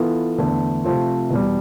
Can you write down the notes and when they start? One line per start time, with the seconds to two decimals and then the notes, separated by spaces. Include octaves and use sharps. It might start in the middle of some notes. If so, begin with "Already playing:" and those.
Already playing: E3 B3 F4 A4
0.38 E2 D3 A3
0.84 C3 F3 A3 C4 F4
1.30 E2 B2 G3